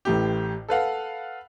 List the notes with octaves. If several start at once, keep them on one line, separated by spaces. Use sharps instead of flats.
A1 A2 G4
A4 B4 F5 F#5